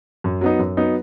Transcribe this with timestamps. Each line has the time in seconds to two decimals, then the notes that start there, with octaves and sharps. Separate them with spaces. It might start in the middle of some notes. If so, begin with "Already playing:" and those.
0.24 F#2
0.41 F#3 B3 D#4
0.59 F#2
0.77 F#3 B3 D#4